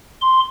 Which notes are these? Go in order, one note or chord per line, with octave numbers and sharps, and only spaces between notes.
C6